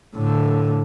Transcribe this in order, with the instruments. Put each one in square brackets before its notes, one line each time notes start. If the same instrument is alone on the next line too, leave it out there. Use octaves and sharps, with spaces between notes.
[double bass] A2 D3